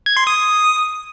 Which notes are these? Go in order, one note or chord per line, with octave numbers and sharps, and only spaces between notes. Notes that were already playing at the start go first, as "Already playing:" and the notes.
G#6
C6
D#6